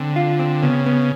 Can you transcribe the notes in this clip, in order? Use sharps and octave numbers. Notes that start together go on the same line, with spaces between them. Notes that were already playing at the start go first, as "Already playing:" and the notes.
Already playing: D3 C4
F4
C4
C#3 B3
B3